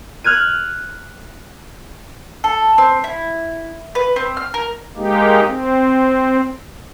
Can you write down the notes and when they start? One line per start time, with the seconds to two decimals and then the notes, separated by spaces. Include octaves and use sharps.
0.24 F6 F#6 G#6 D#7
2.44 A4
2.78 C4
3.04 E4
3.95 B4
4.16 C4
4.37 F6
4.54 A#4
4.97 G#3 A#3 D#4 G4
5.47 C4